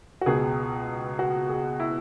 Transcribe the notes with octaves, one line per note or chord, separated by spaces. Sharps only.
F#4
C#2 B2 G#4
F#4
G#4
E4